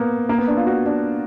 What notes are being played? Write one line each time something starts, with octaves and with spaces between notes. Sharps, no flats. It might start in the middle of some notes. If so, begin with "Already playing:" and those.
Already playing: A#3 B3
A#3
B3
D4
F4
F#4
D4